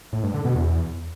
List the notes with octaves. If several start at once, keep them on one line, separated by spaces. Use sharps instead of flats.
A2
G2
D3
B2
E2